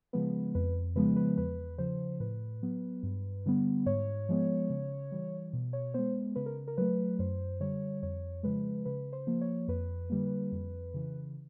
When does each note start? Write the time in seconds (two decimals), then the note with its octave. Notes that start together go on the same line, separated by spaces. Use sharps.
0.13 C#3 F3 G#3 B3 B4
0.55 F2 B4
0.95 C#3 F3 G#3 B3 B4
1.16 B4
1.37 E2 B4
1.78 C#3 F3 C5
2.20 A2 B4
2.63 F#3 B3
3.03 G2
3.46 D3 G3 B3
3.86 G#2 C#5
4.29 F3 G#3 B3
4.70 C#3
5.12 E3 G3
5.53 B2
5.73 C#5
5.94 G#3 B3 C5
6.36 C#3 B4
6.46 A#4
6.68 A#4
6.77 F#3 A3 B4
7.19 F#2 C5
7.60 D3 G3 C#5
8.02 F2 C#5
8.43 C#3 F3 G#3 B4
8.85 C#3 B4
9.13 C5
9.27 F3 A#3
9.41 C#5
9.68 F2 B4
10.10 D3 G3 A#3
10.52 F2
10.94 C#3 E3